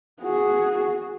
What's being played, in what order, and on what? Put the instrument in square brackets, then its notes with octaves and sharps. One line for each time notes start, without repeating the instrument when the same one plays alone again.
[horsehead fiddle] F#4 G#4